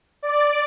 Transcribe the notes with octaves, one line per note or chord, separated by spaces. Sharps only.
D5